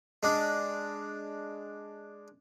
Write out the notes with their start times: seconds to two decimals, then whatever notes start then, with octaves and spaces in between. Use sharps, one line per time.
0.23 G#3 D4